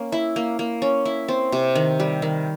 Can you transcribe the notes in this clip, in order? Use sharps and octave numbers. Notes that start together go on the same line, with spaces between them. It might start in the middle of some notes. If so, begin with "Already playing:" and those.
Already playing: A#3 C#4
E4
A#3
A#3
C#4
E4
C4
C3
D#3
G3
D#3